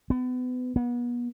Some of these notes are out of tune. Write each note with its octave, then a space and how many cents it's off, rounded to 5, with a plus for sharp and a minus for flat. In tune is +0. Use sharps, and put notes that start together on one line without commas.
B3 +30
B3 -35